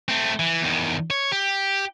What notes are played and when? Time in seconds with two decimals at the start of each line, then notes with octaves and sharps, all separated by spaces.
0.09 A3 C4
0.39 E3
0.61 E2 D#3
1.10 C#5
1.32 G4